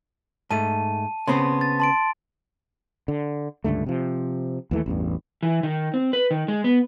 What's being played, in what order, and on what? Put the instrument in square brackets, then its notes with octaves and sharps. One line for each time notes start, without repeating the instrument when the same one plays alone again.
[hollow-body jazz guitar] G#2 A3 [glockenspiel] A5 D#7
[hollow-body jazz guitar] C#3 B3 C4 [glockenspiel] C6
[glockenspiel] A6
A5 C6 D7
[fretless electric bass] D3
C#2 G2 D3 A3
C3 F3
D#2 E3 A3
A1 E2 G2
[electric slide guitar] E3
D#3
C4
B4
D#3
G#3
B3